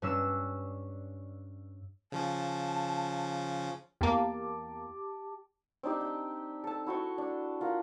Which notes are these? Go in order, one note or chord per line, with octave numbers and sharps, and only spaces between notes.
G2 C#4 D4 E6
C#3 F3 C#4 A5
E2 A#3 G4 A5 D6
C4 D4 D#4 G4
G5
A4 A5
E4 F#4 G5 C#6
D4
F4 A#4 F#5